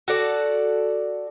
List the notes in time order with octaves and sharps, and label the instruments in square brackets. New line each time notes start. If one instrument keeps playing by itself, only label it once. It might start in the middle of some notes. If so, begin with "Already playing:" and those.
[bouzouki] F#4 A4 D5